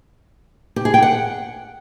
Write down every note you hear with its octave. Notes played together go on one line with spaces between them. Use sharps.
G4
G#4
G5
F#5